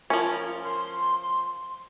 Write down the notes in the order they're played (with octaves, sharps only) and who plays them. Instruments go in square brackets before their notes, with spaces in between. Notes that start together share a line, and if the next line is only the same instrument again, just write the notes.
[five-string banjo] F3 C#4 [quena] A#4
[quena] C6